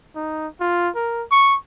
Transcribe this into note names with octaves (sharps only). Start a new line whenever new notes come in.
D#4
F4
A#4
C#6